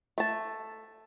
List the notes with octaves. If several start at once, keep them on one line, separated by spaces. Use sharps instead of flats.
A3 A5